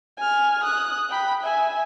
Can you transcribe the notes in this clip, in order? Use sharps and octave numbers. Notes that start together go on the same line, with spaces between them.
G#5 F6
D#6 F#6
G5 B5
E5 G#5